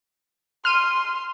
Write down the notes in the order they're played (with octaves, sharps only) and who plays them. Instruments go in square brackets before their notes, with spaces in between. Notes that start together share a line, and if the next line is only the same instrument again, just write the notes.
[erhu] C6 [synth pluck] F6 D#7